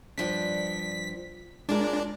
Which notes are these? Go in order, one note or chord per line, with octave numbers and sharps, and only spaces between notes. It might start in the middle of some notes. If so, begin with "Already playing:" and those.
G2 F3 D4 B6
G#3 D4 F4 A#4